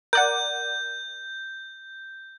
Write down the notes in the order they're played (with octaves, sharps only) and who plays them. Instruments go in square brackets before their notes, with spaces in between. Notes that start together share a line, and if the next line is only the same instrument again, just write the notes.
[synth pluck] A#4 D5 F#5 [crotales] G6